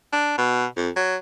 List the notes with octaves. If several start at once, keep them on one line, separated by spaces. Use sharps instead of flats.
D4
B2
F2
F#3